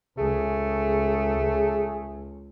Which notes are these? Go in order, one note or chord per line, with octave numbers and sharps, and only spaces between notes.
C#2 A3 G#4